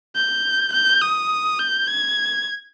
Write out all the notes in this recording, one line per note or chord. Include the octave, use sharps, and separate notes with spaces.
G6
G6
D#6
G6
G#6